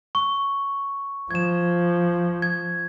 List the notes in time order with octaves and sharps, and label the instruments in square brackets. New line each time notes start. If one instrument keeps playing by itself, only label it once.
[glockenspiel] C#6
[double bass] F3 [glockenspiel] G#6 E7
[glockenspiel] G#6